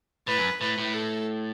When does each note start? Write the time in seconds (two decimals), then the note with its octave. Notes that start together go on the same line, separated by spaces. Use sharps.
0.27 A2 B4
0.38 F#2
0.61 A2 B4
0.78 A2
0.94 A4